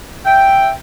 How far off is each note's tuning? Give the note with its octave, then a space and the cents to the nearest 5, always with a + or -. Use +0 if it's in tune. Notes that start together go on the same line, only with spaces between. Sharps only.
E5 +0 G5 +0